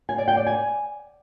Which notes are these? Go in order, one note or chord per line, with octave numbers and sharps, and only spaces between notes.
G#5
D5
G5
D5
G#5